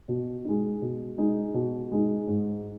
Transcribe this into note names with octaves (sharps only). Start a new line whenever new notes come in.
B2
G#3 D#4
B2
G#3 D#4
B2
G#3 D#4
G#2